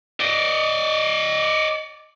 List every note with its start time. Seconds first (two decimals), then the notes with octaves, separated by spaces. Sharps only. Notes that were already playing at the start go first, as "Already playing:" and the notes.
0.20 D5 D#5